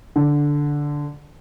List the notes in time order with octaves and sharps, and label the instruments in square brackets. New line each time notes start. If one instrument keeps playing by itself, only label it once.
[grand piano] D3